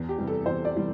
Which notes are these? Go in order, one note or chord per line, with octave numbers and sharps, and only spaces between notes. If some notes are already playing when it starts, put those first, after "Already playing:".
Already playing: E2
G4
C3 E3 G3
A4
E2 C5
D5
C3 E3 G3